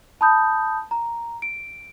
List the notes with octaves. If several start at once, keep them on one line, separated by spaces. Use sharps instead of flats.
A5 B5 D#6 G6
A#5
D7